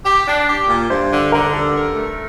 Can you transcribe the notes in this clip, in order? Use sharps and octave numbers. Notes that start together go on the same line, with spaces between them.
G4
D4
G4
A#2
G2 C5
D3
D3 A#4
G2 A4
A#4
A3